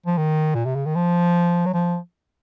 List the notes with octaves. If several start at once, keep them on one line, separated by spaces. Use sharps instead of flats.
F3
D#3
A#2
C3
C#3
D#3
F3
F#3
F3